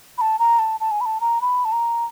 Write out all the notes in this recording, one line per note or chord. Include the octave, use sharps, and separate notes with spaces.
B5
A5
A#5
A5
A5
G#5
B5
A5
A#5
B5
A5
A#5